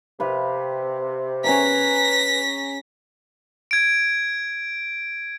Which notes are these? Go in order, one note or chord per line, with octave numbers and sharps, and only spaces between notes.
C3 B4 F5
C#4 G#4 B4 A#5 A#6 B6
G#6 D7